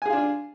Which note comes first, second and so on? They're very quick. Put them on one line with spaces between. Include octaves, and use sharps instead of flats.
G#5 G#4 F4 D4